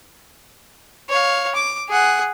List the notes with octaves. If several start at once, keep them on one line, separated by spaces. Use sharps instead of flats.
C#5 F5
D6
G#4 F#5